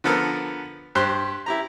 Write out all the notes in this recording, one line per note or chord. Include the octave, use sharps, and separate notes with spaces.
D3 F3 B3 A4 A#4
G2 G4 C5 C6 F#6
E4 G4 A#5